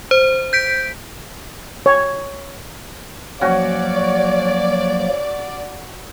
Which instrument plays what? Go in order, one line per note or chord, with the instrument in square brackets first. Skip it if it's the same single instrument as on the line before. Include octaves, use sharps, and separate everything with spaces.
[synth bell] C5
G6 B6 D7
[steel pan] C#5
[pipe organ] F3 F#3 A#3 [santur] C#4 F#4 G#5 [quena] C#5 [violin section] D5